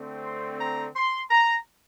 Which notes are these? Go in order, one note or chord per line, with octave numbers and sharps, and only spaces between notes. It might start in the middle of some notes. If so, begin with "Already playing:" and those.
Already playing: D3 A3 C4
C6
A#5
C6
A#5